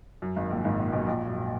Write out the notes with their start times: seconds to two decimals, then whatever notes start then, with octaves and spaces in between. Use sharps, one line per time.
0.22 F#2
0.36 G#1 G#2
0.51 A#1 A#2
0.65 G#1 G#2
0.78 A#1 A#2
0.92 B1 B2
1.07 A#1 A#2
1.28 F#2